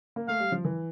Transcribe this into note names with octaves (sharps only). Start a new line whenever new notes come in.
A#3
A3 F5
G3
F3
E3